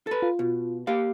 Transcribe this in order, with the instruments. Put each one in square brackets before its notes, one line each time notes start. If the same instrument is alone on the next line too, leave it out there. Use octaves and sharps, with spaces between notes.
[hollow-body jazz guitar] A4 B4
[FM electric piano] F4
[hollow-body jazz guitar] B2
A#3 G4 F5